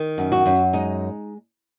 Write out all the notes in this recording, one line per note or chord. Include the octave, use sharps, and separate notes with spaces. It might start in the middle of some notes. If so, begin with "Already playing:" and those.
Already playing: D#3
F#2
F#4
F#2
G#3 D#4